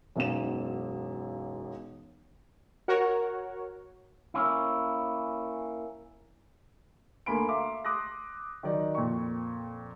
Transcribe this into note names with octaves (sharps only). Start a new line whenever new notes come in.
E1 B1 F#2 E7
F#4 A#4 C#5 F#5
A#3 C#4 E4
D2 A#3 G#5 B5 C6 D7
E5 F5 A#5 C6 D6
C6 D6 D#6 F#6 A#6
D#3 F#3 D#4 D5
F2 A#2 G5 C#6